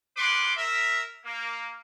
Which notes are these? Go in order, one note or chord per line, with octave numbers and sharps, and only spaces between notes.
A#3 B3 B4 C6 D6
A#4 E5
A#3